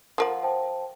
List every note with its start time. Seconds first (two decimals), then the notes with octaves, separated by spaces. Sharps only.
0.18 F3 A#4 F#5
0.43 C5 G5 A5